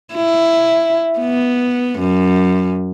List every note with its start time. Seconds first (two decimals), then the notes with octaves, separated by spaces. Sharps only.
0.15 E4
1.19 B3
2.00 F#2